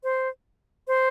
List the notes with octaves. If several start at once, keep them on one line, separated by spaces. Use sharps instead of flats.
C5
C5